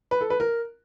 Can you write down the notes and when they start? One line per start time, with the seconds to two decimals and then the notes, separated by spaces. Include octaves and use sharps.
0.11 B4
0.21 A4
0.30 B4
0.40 A#4